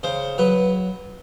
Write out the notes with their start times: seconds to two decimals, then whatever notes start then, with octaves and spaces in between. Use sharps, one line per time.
0.03 C#3 C5
0.38 F#3 B4